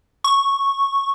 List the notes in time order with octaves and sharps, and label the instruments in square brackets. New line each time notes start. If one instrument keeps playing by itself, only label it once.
[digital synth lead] C#6